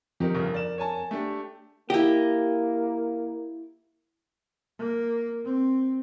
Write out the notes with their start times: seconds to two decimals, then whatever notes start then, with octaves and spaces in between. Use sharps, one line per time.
0.20 F2 D#3 D#4 G4 A#4
0.35 G1 C#3
0.54 D5 E7
0.78 C#5 G#5 A5
1.11 A3 D4 G4
1.90 A#3 E4 G4 D#5
4.79 A#3
5.45 C4